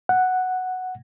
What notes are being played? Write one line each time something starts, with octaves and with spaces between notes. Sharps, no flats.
F#5